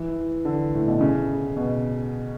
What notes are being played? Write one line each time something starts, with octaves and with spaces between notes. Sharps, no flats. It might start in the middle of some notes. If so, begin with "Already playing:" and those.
Already playing: E3
D3
A2
B2
C#3
B2